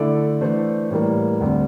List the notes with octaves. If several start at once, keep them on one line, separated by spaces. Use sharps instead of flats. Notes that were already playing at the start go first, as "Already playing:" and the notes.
Already playing: D3 A3 E4 A4 D5
E3 A3 D4 A4 C5
A2 E3 G3 A#3
D2 D3 G3 C4